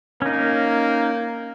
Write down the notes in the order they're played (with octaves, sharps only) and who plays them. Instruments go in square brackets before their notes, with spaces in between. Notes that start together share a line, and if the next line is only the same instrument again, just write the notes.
[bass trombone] A#3 [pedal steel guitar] C#4 D#4